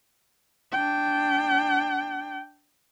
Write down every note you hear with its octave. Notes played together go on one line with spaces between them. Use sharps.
D4 G5